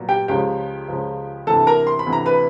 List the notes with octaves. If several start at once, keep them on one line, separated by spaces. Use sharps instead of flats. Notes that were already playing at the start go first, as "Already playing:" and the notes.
Already playing: A#2 F#3 B3
G4 G5
C#2 C#3 F3 G4 G5
C#2 C#3 F3
D2 C3 E3 A4 A5
A#4 A#5
C6
B5
D2 C3 E3
A#5
B4 B5